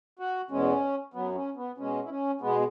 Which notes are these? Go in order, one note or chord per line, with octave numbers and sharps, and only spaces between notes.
F#4
E2 B2 G#3 C#4
F#2 F#3 B3
C#4
B3
B2 G#3 C#4
E4
C#4
B2 G#3 B3